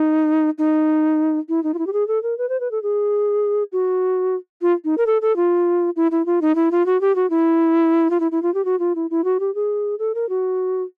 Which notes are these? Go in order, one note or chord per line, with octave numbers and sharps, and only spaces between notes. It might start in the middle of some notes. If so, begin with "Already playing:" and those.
Already playing: D#4
D#4
E4
D#4
F4
E4
G4
G#4
A4
A#4
B4
C5
B4
A4
G#4
F#4
F4
D#4
A#4
A4
A4
F4
E4
E4
F4
D#4
E4
F4
F#4
G4
F#4
E4
F4
E4
E4
F4
G4
F#4
F4
E4
E4
F#4
G4
G#4
A4
A#4
F#4